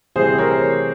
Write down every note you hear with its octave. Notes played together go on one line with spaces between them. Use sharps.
C3 E3 G3 C4 G#4 C5
A#4 C#5